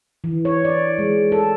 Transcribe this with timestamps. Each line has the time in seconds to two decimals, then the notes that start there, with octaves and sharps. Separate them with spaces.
0.24 E3
0.45 C#5
0.65 D5
0.99 G#3
1.32 A4